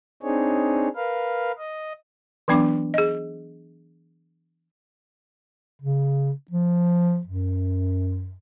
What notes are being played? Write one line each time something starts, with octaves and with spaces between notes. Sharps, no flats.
C4 D4 D#4 G#4 C#5
A#4 B4 F5
D#5
E3 F#3 B3 D4 D6
G#4 D#5
C#3
F3
F#2